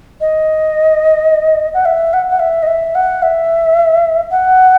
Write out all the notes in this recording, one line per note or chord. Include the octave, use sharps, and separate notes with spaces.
D#5
F#5
E5
F#5
F#5
E5
D#5
E5
F#5
E5
F#5